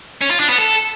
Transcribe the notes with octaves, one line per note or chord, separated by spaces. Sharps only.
C#4
F4
D4
B3
A4